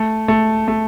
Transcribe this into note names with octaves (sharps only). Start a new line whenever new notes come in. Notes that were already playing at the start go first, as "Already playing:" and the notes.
Already playing: A3
A3
A3